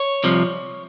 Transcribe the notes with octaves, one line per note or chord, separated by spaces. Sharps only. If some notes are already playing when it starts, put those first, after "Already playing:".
Already playing: C#5
C2 C3 F3